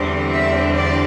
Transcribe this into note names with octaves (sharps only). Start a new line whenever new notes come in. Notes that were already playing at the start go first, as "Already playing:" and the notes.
Already playing: E2 D3 G3 C4
E5
D5